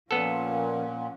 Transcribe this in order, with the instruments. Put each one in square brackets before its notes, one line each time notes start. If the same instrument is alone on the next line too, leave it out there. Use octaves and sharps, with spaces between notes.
[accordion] A#2 [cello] F3 C#4 [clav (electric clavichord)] B3 A4 [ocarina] F#5